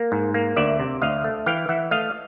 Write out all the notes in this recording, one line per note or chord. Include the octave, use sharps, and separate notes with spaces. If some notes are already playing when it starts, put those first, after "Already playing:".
Already playing: A#3 A#4
G#2
A#3
D2 D5 E5
C3
D2 D#5 F5
A3
E3 F5 G5
E3 E5 F#5
A3 D#5 F5